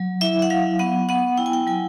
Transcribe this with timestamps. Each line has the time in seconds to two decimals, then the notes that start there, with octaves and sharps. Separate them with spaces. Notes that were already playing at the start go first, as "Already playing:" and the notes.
Already playing: F#3
0.21 E4 E5
0.42 F#5
0.50 F#3 F5
0.79 B3 F#5
1.09 B3 F#5
1.37 E4 G5
1.46 G#5
1.53 G5
1.67 F#3 G#5